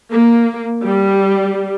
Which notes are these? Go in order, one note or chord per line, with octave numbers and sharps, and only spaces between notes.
A#3
G3